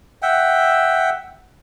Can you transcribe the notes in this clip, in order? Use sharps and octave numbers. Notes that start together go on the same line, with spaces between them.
E5 F#5 G5